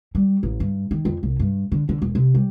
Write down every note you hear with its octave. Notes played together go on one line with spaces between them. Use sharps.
G3
A1
G2
D#3
F2
C2
G2
D3
D3
E1
C3
G3